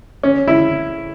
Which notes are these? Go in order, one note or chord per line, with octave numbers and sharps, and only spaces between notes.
C#4
E4